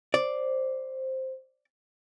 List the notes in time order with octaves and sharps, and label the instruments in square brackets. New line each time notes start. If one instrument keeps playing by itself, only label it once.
[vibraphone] C5 [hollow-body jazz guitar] D5